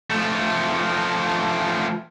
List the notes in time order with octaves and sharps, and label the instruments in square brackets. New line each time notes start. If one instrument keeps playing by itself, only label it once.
[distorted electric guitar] F3 A3